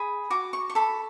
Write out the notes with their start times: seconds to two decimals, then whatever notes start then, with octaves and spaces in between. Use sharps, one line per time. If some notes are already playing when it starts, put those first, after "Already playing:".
Already playing: G#4 B5
0.30 F#4 D6
0.53 C#6
0.70 C#6
0.75 A4 B5